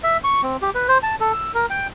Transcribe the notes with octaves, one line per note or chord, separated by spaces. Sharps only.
E5
C#6
C4
G4
B4
C5
A5
A4
E6
A#4
G5